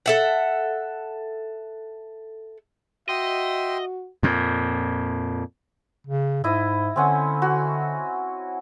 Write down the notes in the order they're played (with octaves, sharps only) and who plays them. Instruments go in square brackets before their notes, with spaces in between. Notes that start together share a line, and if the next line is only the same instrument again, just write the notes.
[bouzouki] A4 E5 F#5
[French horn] F#4 [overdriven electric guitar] D#5 [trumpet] E5 [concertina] G5 C6
[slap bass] F2 A#2
[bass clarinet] C#3
[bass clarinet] G#2 [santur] E4 D#5
[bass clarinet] D3 [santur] C4 C#4 F#5
[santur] F#4